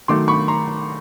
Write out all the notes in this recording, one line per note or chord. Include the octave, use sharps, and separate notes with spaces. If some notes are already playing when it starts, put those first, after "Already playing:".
D#3 F#3 A3 C6 D6
B5 C#6
A#5 C6